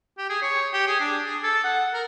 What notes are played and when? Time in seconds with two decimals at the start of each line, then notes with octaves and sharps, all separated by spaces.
0.18 G4
0.30 G#4
0.42 C#5
0.73 G4
0.88 G#4
1.00 D4
1.26 G#4
1.44 A4
1.64 F#5
1.94 A#4